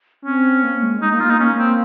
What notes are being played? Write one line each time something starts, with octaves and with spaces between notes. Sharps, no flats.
C4 C#4
A#3
G#3
G#3 D#4
A#3 D#4
F4
A#3 D#4
A#3 C#4
C4